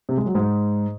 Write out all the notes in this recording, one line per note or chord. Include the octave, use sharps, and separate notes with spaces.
C3
G#3
F#3
G#2